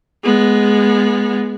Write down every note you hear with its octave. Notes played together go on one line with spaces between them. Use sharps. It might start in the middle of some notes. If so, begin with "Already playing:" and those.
G#3 B3